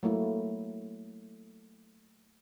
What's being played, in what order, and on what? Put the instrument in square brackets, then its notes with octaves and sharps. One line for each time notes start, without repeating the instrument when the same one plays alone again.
[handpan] F#3 A3 A#3 E4